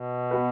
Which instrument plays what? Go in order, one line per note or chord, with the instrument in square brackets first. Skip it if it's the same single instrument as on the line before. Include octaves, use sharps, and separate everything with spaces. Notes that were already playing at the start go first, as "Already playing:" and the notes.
Already playing: [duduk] B2
[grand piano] B3 F#4 B4